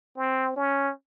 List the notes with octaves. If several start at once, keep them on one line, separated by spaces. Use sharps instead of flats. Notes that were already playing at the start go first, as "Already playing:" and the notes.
C4
C#4